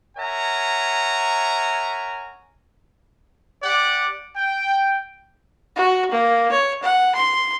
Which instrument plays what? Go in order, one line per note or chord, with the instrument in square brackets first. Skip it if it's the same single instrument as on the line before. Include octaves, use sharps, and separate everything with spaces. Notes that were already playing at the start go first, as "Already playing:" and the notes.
[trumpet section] A#4 C#5 E5 F#5 G#5 A#5
G4 D5 F#5
G5
[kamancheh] F#4
A#3
C#5
F#5
C6